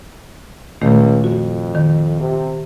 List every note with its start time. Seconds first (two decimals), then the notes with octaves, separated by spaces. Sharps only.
0.81 C#2 A#2 D#3 A3
1.24 F2 F#4
1.75 D#3
2.20 C3